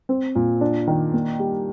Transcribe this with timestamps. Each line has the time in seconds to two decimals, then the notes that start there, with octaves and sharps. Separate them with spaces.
0.09 C4
0.35 A#2
0.61 D4
0.87 D#3
1.14 A#3
1.40 G3